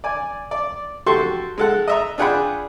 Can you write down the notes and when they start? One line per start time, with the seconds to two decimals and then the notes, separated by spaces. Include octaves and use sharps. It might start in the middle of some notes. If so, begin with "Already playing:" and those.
0.04 D5 G#5
0.51 D5
1.06 F#4 G4 A4 C6 C#6
1.58 G#3 A4 F#5
1.88 D#5 E5 A#5
2.18 D4 F4 G#4 F#5 G5 B5